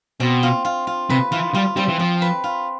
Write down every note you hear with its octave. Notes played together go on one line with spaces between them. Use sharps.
B2 C4
F4
F4
F4
C3 B4
E3 F4
G3 F4
G3 C4
E3
F3 C4
B4
F4